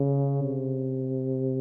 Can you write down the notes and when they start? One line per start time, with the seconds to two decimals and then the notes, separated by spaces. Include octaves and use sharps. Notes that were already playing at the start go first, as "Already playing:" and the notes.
Already playing: C#3
0.43 C3